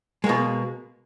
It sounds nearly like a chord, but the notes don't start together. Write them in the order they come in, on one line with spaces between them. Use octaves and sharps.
G#3 A#3 B2